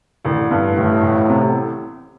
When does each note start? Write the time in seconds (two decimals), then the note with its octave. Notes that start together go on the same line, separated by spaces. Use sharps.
0.25 A1 D3
0.51 G2
0.76 A1 A2
1.03 A1
1.29 C3